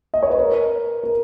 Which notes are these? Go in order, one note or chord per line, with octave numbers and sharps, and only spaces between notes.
D#5
C#5
B4
A#4
A#4